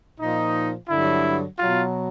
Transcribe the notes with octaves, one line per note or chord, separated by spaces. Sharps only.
A#2 F3 D#4
G2 D3 F#3 E4
B2 F#3 F4